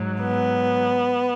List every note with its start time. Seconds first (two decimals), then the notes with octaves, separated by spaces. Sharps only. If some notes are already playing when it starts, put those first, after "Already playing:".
Already playing: G#2 F#3
0.22 B3